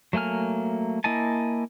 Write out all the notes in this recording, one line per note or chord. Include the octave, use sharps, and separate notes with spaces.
F#3 A3 A#3 G#5 F6
A#3 E4 D#5 G#5 A5